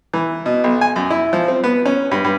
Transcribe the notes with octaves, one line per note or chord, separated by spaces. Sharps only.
E3
B2
B1
G#5
F#2
E4
F3
C4
B3
C#4
G2
G2